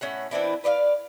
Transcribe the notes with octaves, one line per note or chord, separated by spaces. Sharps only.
A2 C#4 E5 F#5
E3 C4 D4 E4
B4 D5 D#5 F5